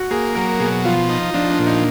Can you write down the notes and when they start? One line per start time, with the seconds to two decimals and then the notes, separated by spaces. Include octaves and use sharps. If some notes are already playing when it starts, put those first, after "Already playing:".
Already playing: F#4
0.11 A#3 G#4
0.35 F#3 A#4
0.60 B2 G#4
0.85 F3 F4
1.09 D#4
1.34 F3 D4
1.51 D4
1.59 A#2
1.67 D#4